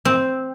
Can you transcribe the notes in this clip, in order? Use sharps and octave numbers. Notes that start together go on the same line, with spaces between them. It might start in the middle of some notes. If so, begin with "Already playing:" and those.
C4